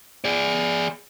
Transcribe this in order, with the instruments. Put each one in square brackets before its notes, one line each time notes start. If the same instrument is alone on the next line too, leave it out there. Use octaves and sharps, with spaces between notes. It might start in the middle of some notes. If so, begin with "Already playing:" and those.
[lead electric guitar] G#4 D5